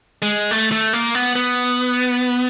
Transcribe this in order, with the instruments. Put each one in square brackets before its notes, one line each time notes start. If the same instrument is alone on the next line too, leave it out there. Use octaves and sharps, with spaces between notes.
[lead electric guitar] G#3
A3
A3
A#3
B3
B3